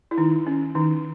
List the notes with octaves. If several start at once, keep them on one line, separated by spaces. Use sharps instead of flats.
E4
D#3 D#4
C#4
D#3 D#4